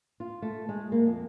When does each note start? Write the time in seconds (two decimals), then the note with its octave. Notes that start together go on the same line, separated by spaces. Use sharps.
0.20 F4
0.42 A3
0.69 G#3
0.92 A#3
1.07 F2